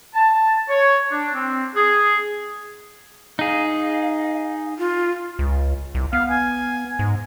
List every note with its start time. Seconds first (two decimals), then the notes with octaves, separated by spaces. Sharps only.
0.15 A5
0.70 C#5
1.11 D4
1.34 C4
1.75 G#4
3.39 D#4 G#4 F5
4.78 F4
5.39 C#2
5.95 C2
6.13 B3 F5
6.31 G#5
6.99 G#2